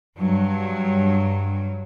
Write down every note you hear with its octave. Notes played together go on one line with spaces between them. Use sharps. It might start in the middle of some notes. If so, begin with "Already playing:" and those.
G2 F#3